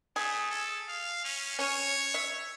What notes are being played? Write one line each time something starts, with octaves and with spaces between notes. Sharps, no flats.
A3 G#4
A4
F5
C#4
C#4 C#5
E5